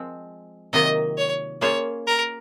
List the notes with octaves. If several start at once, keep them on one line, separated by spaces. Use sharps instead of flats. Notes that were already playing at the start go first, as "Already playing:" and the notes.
Already playing: F3 G#3 C4
C3 D#3 F#3 A#3 F4 D#5
C#5
A#3 C#4 F4 G#4 C5 C#5
A#4